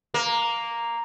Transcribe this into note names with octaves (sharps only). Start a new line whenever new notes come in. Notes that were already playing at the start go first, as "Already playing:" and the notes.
A#3